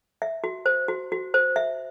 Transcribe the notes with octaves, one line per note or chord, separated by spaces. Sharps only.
E5
F#4
C5
F#4
F#4
C5
E5